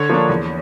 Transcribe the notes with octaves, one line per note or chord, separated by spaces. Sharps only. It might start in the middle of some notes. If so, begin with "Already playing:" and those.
Already playing: D3 C#5
F3 A#3 D4
E2